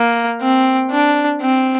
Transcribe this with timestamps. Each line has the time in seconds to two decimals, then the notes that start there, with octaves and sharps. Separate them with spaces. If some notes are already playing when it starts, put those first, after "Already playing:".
Already playing: A#3
0.41 C4
0.91 D4
1.41 C4